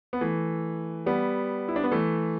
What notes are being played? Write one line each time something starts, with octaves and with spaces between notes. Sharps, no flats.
B3
E3 A3
G3 B3
E4
D4
B3
E3 A3